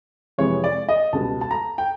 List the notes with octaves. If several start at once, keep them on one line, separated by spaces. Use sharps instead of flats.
F2 C3 E3 G#3 C#5
D5
D#5
C#2 B2 G3 A5
A5
A#5
G5